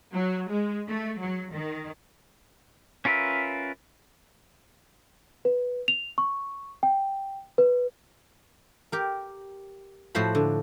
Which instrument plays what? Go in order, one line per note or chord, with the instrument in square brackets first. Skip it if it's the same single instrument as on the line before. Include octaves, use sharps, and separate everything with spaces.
[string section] F#3
G#3
A3
F#3
D#3
[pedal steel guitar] C#4 F4 A#4 B4 E5
[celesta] B4
F7
C#6
G5
B4
[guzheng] G4 A#4
A2 F3 A3 F#4 C5 B5
D3